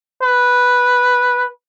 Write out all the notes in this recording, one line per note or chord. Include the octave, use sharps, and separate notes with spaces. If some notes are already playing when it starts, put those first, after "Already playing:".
B4